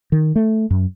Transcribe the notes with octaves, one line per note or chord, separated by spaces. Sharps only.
D#3
A3
F#2